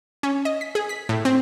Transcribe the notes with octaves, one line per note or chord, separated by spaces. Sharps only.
C#4
D#5
B6
G#4
B6
A2
C4